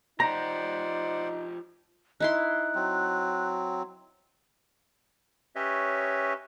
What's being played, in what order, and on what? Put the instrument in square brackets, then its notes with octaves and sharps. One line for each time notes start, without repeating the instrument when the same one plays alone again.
[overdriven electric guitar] F3 G4 [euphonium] D#4 [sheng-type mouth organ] C5 D5 F#5 [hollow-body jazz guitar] A#5
[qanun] D#4 E4 C6 [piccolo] F#6
[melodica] F#3 C4
[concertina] C#4 G4 B4 C#5 D#5 E5